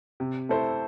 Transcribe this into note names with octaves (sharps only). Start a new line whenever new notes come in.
C3
A3 E4 A4 C5